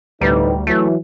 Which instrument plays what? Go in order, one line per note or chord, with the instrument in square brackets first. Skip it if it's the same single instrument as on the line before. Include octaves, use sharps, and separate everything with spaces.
[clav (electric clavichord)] D2 A#5 [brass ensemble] A2 C3 D#4 [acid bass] G3 [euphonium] B4
[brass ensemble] E3 [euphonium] F#3 [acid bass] A3